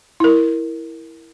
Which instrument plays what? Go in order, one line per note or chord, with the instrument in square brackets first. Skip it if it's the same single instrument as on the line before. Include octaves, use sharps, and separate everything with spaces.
[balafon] E4 A#4